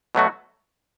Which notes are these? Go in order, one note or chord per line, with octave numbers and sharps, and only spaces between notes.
B2 F#3 A3 F#4